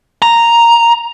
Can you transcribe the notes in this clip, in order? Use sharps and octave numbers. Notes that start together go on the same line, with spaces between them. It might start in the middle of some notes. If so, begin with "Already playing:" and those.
A#5